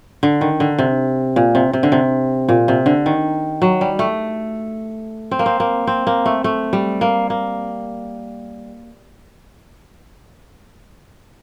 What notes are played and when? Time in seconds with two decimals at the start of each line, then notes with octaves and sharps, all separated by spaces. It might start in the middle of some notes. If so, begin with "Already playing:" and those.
0.23 D3
0.41 D#3
0.60 D3
0.79 C3
1.36 A#2
1.55 C3
1.73 C3
1.83 D3
1.92 C3
2.49 A#2
2.68 C3
2.86 D3
3.06 D#3
3.62 F#3
3.81 G3
3.99 A3
5.31 C4
5.39 A#3
5.46 C4
5.60 A#3
5.87 C4
6.07 A#3
6.26 A3
6.44 A3
6.73 G3
7.01 A#3
7.30 A#3